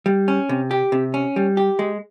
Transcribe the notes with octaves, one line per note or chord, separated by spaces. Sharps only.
G3
C#4
C3
G4
C3
C#4
G3
G4
G#3